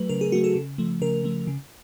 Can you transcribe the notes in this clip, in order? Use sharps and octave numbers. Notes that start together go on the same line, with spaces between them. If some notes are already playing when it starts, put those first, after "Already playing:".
Already playing: F#3 A3 B4
C#3 A#4
G#4
F#3 A3 F#4
A4
C#3
F3 A3
C#3 A#4
F3 A3
C#3